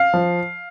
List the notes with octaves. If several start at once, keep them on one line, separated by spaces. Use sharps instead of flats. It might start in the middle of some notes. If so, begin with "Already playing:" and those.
Already playing: F5
F3